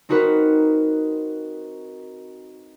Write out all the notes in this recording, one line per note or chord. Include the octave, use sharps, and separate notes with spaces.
C4 D#4 F#4 A#4 B4